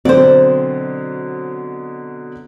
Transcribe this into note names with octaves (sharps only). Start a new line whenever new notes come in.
B2 D3 F#3 C4 C5 D5